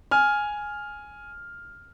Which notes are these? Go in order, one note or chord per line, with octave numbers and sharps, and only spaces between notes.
G#5 F6